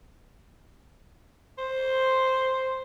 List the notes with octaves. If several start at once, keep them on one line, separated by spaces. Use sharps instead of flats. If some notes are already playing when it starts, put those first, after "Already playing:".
C5